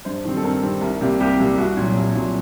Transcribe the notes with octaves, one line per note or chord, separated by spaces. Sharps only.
G2 C5
D#3 G3 C4
A4
G2 A#4
D#3 G3 C4
C2 A#4
C3 G3 A#3
C2 G4
C3 G3 A#3
C2 F#4
A#2 F#3
C2
A#2 F#3